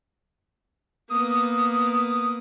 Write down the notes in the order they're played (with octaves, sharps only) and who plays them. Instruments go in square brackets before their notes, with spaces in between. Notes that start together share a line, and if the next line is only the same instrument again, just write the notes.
[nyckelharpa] A#3 B3 [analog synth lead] D#6